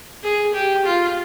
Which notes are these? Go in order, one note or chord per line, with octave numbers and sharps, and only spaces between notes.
G#4
G4
F4